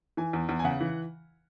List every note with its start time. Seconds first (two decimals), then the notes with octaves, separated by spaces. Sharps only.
0.17 E3 G#5
0.33 E2
0.49 E2
0.59 G#5
0.64 C#3 F#5
0.81 E3